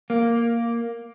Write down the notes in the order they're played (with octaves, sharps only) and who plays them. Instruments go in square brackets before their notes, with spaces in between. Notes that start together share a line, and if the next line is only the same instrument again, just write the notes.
[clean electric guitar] A#3